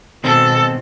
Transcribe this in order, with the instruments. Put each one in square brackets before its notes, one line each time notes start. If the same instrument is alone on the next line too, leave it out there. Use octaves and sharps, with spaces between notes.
[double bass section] B2 [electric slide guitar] D#3 C4 [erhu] A4